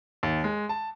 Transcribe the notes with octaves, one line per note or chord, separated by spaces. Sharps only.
D#2
G#3
A5